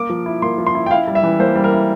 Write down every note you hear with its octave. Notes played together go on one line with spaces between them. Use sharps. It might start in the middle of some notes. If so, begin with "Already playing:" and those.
Already playing: A#3 D6
F3
E4
A#3 C6
F3
C6
E4
G5
E4 F5
G3
E5
E3
A#3 C5
G3
A#4
E4